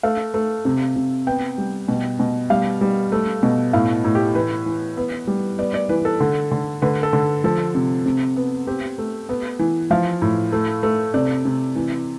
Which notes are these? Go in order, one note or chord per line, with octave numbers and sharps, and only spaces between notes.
A3 F5
A3
C3
C3
B3 G5
G3
B2
B2
G3 F5
G3
A3
B2
A2 F5
A2
G4
E3 B4
E3
B3
G3
B3 D5
D5
E3 B4
A4
D3
D3
D3 B4
A4
D3
F3 A4
C3
C3
B3
C4 G4
A3
B3
E3
F3 F5
A2
A3
A3
C3 D5
C3
E3